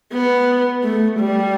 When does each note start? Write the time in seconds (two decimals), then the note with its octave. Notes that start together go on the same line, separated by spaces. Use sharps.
0.13 B3
0.84 A3
1.19 G3